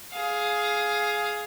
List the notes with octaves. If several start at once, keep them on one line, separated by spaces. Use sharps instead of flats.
G#4 F5